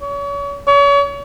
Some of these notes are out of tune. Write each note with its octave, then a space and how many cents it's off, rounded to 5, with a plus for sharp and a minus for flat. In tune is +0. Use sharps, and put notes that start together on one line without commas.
C#5 +35
C#5 +35